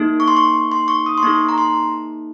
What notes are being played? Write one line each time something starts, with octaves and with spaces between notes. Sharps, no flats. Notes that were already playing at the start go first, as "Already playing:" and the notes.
Already playing: A#3 D#4 G#4
C#6
C6
C#6
C6
C#6
D#6
C6
A#3 D#4 G#4 C#6
A#5
C6